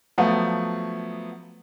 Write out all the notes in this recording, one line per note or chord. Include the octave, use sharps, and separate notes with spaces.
F3 F#3 A3 B3